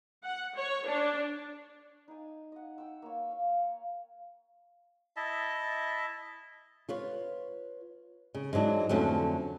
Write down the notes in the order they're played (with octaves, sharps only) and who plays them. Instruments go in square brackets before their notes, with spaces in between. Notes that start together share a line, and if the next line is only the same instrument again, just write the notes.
[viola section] F#5
C#5
D4
[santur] D#4 G#5
D#5 F#5
G5 E6
A#3 C#5
F5
[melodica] E4 D#5 E5 A5
[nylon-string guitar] F4 B4 C#5
C#3
G#2 E3 F#3 D4
F2 D3 F#3 A3 C#4